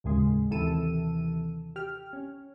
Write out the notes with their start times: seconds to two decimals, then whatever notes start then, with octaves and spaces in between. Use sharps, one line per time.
0.04 A1 D#2 C#3 G#3
0.51 D#2 C3 E3 A4 E6 D#7
1.76 G4 F6
2.13 C#4